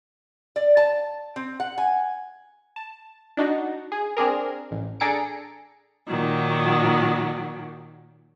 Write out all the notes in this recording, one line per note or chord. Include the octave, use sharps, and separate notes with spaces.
D5
A5
C4
F#5
G#5
A5
D4 D#4 F#4
G#4
C4 D4 G#4 A#4
A1
D4 G#4 A4 A#5 C#7 D7
A#2 D#3 F#3